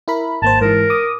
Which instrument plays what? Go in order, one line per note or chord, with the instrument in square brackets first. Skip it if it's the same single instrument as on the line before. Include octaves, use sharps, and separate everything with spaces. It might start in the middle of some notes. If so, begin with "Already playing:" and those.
[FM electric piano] E4 A#4 B5
[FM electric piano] G#1 A#3 C5 [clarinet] A5
[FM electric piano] G#2 E3 [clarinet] A#4
[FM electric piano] D6 D#6